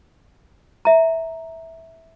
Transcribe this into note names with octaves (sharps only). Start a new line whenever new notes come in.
E5 A#5